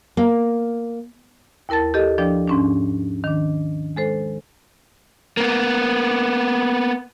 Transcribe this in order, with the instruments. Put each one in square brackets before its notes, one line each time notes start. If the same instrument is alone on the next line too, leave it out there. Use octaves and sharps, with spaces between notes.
[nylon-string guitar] A#3
[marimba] D#2 E4 A#4 A5 A6
G4 A4 D#5
F3 D4 D5 G5 G6
G#2 C#4 D4
D#3 D4
G#3 A4 C5
[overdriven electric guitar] A#3 B3